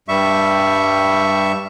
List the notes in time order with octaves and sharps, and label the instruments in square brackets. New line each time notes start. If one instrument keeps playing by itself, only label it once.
[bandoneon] G2 G3 E5 C#6